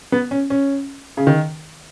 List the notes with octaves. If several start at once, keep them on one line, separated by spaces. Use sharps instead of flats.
B3
C#4
C#4
C#3
D#3